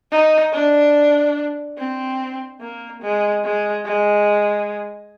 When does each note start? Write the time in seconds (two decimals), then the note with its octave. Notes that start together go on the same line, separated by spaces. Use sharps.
0.11 D#4
0.52 D4
1.77 C4
2.60 A#3
3.02 G#3
3.43 G#3
3.85 G#3